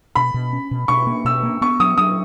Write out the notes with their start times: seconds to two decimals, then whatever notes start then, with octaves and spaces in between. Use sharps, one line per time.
0.15 B2 B5
0.34 B2
0.53 C#4
0.71 B2
0.88 B2 C#6
1.07 A#3
1.25 B2 E6
1.43 A#3
1.61 B3 C#6
1.80 F#3 D#6
1.98 F#3 D#6